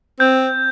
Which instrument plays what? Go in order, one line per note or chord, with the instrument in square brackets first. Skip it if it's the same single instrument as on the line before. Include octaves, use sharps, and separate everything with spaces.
[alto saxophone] C4 [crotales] G6